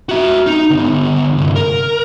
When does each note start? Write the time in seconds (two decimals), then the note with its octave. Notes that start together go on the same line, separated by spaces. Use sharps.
0.09 F#4 E5
0.46 D#4
0.70 D3 B3
1.37 C2 G2
1.55 A#4